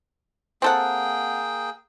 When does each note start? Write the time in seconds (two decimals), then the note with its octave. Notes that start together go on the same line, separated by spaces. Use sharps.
0.62 A#3 C4 G#4 A4 F#5 G5